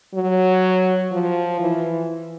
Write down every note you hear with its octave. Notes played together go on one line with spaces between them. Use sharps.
F#3
F3
E3